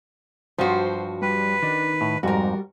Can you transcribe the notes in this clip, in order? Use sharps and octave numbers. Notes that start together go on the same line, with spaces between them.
G2 F3 F#3 F#4 C5
G3 B4
D#3 D4
A2
F2 G#2 G3 F#4 A#4